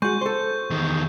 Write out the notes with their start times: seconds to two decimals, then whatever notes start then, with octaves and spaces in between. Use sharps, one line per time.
0.02 G#3 F#4 C#6 G6
0.21 A4 C5
0.70 E2 D#3